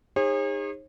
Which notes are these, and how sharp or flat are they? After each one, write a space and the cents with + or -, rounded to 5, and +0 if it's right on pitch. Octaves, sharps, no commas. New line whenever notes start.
D#4 +0 G#4 -35 C#5 -45